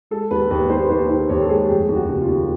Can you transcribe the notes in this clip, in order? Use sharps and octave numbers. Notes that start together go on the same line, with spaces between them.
G#3 A4
D#2 B4
D#2 B4
D#2 C5
B4
D#2 C5
D#3 C5
D#2 C#5
A4
G#3 G#4
F1 G4
D#2
F#4
C#3
F4
D#2